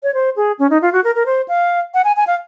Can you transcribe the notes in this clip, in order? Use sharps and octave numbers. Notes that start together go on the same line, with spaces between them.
C#5
C5
G#4
C#4
D#4
F4
F#4
A#4
A#4
C5
F5
F#5
G#5
G#5
F5